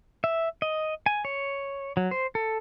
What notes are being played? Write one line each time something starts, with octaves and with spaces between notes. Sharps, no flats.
E5
D#5
G#5
C#5
F#3
C5
A4